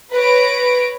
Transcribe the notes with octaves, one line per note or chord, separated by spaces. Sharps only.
B4 C#5 A#6 D7